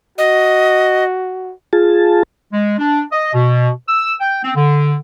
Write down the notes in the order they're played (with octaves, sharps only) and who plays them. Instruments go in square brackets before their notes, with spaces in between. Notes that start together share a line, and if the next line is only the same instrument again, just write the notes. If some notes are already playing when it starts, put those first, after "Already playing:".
[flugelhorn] F#4 [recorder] D#5
[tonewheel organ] F4 G#4 A5
[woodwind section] G#3
D4
D#5
B2
E6
G5
C4
D3